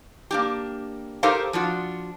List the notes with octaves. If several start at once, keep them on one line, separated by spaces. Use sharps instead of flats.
A#3 D4 G4
D#4 G4 A4 A#4 C5 F5
F3 D4 F4 F#4